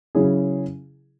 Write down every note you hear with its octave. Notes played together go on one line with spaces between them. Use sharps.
C#3 F#3 C#4 E4 G#4